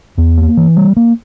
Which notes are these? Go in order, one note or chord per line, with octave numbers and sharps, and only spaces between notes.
E2
A#3
E3
G3
A#3